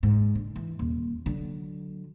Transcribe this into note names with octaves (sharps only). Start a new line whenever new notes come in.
G#2
D3
E3
D#1
D3 F#3